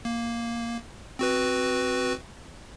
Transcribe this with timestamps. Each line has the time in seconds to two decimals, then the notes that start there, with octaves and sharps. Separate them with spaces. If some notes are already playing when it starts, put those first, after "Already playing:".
0.05 A#3
1.19 C4 F#4 B4